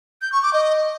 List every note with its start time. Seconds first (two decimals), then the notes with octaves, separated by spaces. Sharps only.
0.22 G6
0.32 C#6
0.43 D6
0.53 D#5